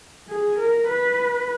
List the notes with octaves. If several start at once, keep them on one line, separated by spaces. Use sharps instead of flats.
G#4
A#4
B4